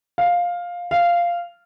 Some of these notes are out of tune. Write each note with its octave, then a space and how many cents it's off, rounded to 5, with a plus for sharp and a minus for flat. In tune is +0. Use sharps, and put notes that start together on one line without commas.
F5 +10
F5 -10